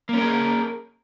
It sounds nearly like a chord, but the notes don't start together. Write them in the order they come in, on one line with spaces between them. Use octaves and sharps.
A#3 C#4 A#4 G#4